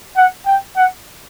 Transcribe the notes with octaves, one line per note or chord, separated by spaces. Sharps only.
F#5
G5
F#5